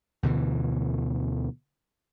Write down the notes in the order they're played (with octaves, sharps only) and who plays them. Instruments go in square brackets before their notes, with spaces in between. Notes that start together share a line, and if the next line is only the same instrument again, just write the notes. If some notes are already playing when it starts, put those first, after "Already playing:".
[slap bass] D2 B2 D3 E3